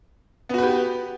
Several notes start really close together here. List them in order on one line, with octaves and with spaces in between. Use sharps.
B3 F#4 B4 G4